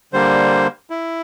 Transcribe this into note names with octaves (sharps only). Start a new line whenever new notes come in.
D3 G3 A#3 C5
E4